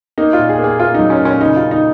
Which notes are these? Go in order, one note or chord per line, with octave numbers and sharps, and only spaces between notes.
A#3 D#4
F4
A#2
G#4
A#3
G#4
A#3 F4
F#3 D#4
C#4
A#2
C#4
C#3 D#4
C#3 F4
D#4